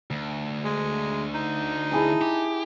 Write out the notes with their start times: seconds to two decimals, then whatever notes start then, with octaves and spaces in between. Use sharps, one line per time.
0.11 D2
0.64 G#3
1.34 D#4
1.92 E4 G#4 A5
2.22 G4